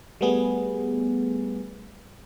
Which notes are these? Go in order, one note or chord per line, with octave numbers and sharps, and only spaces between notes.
G3 A3 B3 G#4